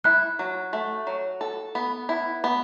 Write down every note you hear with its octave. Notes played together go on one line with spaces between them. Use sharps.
E4 F#6
F#3
A3
F#3
A4
B3
E4
B3